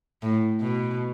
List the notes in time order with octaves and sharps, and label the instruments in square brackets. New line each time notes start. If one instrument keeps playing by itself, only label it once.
[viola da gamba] A2
B2